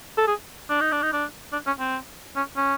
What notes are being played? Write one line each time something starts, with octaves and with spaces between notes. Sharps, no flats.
A4
G#4
D4
D#4
D4
D#4
D4
D4
C#4
C4
C#4
C#4